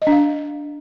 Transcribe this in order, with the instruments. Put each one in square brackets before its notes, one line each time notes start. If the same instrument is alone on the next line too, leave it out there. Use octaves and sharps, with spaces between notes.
[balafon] D#5
D4
F5